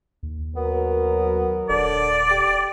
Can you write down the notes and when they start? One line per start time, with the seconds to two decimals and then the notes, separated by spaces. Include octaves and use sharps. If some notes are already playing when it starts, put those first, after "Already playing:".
0.23 D#2
0.56 F#3 B3 A#4
1.69 D#1 D3 D5
2.31 G4